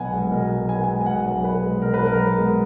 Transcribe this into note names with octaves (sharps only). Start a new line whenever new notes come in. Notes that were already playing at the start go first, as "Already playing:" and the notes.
Already playing: B1 B2 B3 F#5 G#5
G#3 F#5
B2 A#4
B1
B3 G#5
G#3 G#5
G#5
B2 F#5
B1
B3 B4
G#3
B2 A#4
B4
B1
A#4
B3
G#3